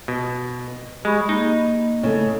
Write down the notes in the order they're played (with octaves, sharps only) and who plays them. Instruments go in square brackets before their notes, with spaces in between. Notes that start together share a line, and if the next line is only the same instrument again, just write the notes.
[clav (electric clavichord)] B2
[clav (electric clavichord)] G#3 [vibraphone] G4 B5 C#6
[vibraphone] A#3 [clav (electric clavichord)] D#4
[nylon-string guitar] C#3 A3 [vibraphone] E4